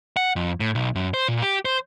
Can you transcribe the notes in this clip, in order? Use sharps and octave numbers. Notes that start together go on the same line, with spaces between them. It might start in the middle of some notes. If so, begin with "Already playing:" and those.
F#5
F2
A2
B1
F#2
C5
A#2
G4
C5